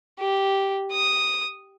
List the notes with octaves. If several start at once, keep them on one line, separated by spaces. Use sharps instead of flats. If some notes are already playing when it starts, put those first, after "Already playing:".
G4
D#6